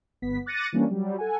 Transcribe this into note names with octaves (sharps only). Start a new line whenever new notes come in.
G1 B3 B6
D6 F#6 A6 A#6 C#7 D#7
E3 G3 A#3 C#4 D4
F#3 G3
A4 F#5 G#5